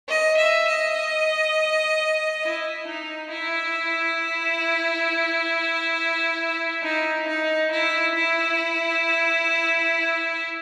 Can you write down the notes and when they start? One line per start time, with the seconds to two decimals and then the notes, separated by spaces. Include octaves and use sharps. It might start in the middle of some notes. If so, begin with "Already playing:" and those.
0.09 D#5
0.37 E5
0.67 D#5
2.43 E4
2.87 D#4
3.31 E4
6.84 D#4
7.28 D#4
7.71 E4
8.15 E4